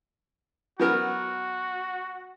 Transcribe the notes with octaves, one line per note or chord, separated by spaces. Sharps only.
F#3 B3 F#4 A#4